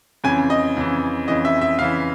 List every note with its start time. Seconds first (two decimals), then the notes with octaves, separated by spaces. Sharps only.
0.24 F2 C#3 E3 G#5
0.50 D#5
0.77 F2 C#3 E3
1.28 F2 C#3 E3 D#5
1.45 E5
1.61 E5
1.79 F2 C#3 E3 F5